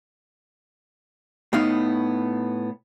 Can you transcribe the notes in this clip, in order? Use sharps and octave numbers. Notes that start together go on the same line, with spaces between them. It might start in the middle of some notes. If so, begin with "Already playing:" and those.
A2 B3 D#4 F5